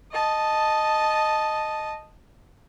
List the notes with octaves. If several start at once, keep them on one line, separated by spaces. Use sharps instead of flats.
D#5 A5